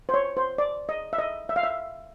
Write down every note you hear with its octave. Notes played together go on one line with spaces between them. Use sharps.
C5
C#5
C5
D5
D#5
E5
D#5
E5
F5
E5